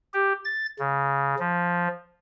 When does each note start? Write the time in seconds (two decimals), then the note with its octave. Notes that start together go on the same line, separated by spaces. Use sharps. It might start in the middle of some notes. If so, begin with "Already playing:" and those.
0.14 G4
0.45 A6
0.79 C#3
1.39 F3